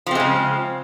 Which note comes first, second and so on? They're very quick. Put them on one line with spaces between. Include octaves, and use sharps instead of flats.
F3 C4 G#3 C#3